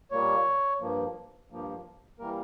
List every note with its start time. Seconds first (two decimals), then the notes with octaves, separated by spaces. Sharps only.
0.11 A#2 G3 A#3 C#5
0.81 G2 F3 A#3
1.50 G2 F3 A#3
2.19 E3 G3 A#3 A#4